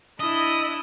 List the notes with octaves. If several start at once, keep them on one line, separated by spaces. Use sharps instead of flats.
D4 E4 D#5